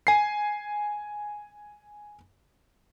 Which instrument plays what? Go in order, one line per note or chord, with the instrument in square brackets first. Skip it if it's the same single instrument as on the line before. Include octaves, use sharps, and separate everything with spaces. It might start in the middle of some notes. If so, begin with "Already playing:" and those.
[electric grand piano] G#5 C7